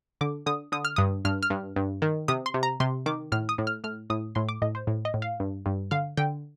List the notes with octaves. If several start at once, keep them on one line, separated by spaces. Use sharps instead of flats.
D3 D6
D3 D#6
D3 D#6
F6
G2 D#6
G2 F6
F6
G2
G2
D#3
C3 D#6
C6
C3
A#5
C3 C6
D#3 D6
A2 F6
D#6
A2
F6
A2 F6
A2 D#6
A2 C6
D6
A2 D#5
C5
A2
D#5
A2
F5
G2
G2
D3 F5
D3 G5